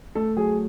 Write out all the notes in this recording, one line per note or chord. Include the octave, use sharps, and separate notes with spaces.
A3 A4
F#3 G#4